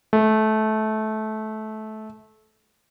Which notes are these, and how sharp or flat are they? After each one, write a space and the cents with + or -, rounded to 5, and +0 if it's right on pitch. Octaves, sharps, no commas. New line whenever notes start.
A3 -20